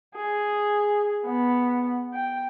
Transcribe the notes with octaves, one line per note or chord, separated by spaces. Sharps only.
G#4
B3
G5